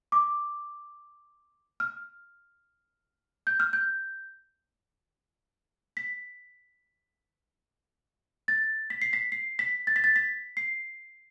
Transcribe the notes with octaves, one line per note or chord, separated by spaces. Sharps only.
D6
F6
G6
F6
G6
B6
A6
B6
C7
B6
C7
B6
A6
B6
A6
B6
C7